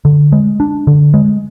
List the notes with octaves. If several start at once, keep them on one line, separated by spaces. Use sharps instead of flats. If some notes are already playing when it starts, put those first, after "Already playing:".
D3
G#3
D4
D3
G#3